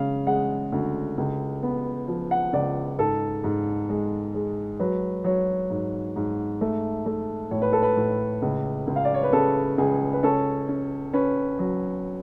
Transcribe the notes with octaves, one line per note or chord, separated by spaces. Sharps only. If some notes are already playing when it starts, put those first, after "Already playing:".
Already playing: C#3 G#3 F5
G#3 F#5
D2
C#2
B3
F3
F#5
C#2 D5
G#2 A4
G#2
G#3
G#3
F#3 B4
F#3 C#5
G#2
G#2
A3
A3
A2 C#5
B4
A4
B4
A2
C#2
C#2
F5
D5
C#5
B4
C#3 A4
C#2 G#4
B4
C#4 A4
C#4
C#4 B4
F#3